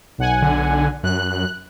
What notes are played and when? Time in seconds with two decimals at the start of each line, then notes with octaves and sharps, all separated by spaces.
0.18 B1 F#5 G#5
0.42 D3
1.03 F#2 F#6